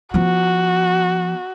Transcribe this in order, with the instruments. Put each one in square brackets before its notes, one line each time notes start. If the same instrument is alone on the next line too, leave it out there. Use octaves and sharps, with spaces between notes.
[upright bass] F3 B3 [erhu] F#4